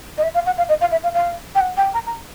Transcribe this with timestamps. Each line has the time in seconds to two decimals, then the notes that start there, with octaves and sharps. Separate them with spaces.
0.18 D#5
0.23 E5
0.34 F5
0.46 F#5
0.58 F5
0.69 D#5
0.81 F5
0.91 E5
1.04 F5
1.14 F5
1.55 G5
1.60 F#5
1.77 G5
1.94 A#5
2.06 A#5